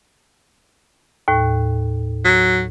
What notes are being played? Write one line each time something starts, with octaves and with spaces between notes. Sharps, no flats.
D#2 A2
F#3